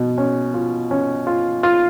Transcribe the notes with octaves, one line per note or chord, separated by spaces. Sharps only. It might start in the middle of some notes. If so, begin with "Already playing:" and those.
Already playing: B2
C#4
F4
C#4
F4
F4